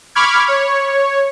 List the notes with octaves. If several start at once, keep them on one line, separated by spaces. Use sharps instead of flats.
B5 C#6 D6 F6 G#6
C#5